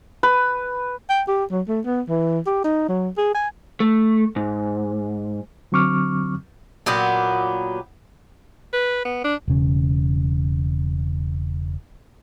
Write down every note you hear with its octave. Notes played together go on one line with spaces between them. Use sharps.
B4
G5
G4
F#3
A3
B3
E3
G4
D#4
F#3
G#4
G#5
A3
G#2
D3 F#3 C4 C#6 D6 F6
A#2 F#3 B3 G4
B4
B3
D4
E1 C#3